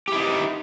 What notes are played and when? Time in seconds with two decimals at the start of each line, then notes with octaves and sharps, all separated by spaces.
0.08 G4
0.12 E4
0.16 D#4